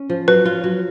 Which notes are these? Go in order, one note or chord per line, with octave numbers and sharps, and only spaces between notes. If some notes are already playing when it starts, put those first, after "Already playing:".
Already playing: C#4
F3
F#3 B4
F4
F#3